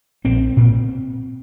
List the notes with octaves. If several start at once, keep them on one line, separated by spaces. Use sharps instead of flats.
A#1 C4
A#2